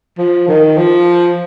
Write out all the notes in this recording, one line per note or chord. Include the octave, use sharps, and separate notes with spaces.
F3
D#3
F3